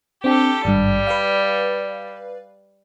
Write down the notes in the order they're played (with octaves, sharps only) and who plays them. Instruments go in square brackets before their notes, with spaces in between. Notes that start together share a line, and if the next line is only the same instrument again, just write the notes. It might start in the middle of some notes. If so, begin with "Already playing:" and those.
[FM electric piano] C4 D4 G5 [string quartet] G4 A4
[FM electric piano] G#1 G2 [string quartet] G3
[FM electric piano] B4 D5 F5